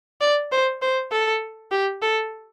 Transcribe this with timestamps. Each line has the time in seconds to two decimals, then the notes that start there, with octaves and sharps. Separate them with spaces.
0.21 D5
0.52 C5
0.82 C5
1.12 A4
1.72 G4
2.02 A4